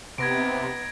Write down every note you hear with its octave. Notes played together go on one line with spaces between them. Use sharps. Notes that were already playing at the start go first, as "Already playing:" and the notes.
C3 B3 D#4 G#6 A#6 D7